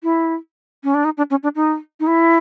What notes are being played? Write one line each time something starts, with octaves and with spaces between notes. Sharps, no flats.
E4
C#4
D4
D#4
D4
C#4
D4
D#4
D#4
E4